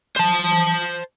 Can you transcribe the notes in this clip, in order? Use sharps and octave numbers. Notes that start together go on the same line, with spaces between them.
C5 A5